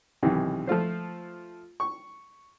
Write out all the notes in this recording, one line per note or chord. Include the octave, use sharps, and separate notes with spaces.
B1 C3 D#3 E3
F3 A3 F4 C5
C#6